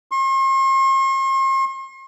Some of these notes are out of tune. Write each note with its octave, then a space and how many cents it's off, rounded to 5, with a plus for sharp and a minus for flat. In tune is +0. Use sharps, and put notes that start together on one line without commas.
C6 +45